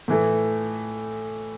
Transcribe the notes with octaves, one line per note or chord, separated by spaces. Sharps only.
A2 E3 A3